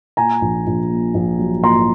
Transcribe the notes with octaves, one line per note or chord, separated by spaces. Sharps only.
A#2 G#5 A#5
A#1
A#1
A#2
A#1
F#3
A#2 A#5 C6